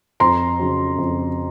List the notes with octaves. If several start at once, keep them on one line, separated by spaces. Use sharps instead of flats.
F2 A#5 C6
C#3 F#3
F2